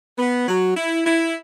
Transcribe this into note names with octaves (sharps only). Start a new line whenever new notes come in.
B3
F#3
E4
E4